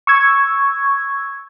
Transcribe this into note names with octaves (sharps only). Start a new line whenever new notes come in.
C#6 E6 G#6